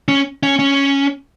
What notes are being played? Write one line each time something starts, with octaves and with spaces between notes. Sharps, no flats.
C#4
C#4
C#4